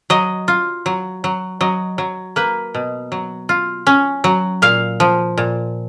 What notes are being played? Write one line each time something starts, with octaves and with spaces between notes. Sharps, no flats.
F#3 D#5
F4
F#3
F#3
F#3 D#5
F#3
A#3 B4
B2
F#3
F4
C#4
F#3
A#2 F5
F3
A#2